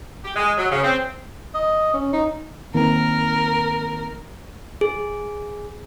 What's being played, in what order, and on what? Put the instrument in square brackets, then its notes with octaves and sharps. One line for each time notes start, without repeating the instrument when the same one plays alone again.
[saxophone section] G4
G#3
F#3
C#3
C4
[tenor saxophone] D#5
C#4
D#4
[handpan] D#3 A#3 C4 [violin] A#4
[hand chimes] G#4